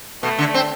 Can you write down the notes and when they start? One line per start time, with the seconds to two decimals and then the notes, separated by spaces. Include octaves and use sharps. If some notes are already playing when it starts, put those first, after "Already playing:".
0.23 B2 A3
0.39 D3
0.54 C4